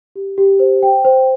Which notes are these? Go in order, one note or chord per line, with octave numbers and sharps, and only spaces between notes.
G4
G4
C5
G5
C5